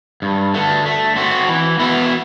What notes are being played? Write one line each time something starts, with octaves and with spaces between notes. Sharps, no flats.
G2
D3 A3
A3
C4 F#4
E3
B3 F#4 B4 E5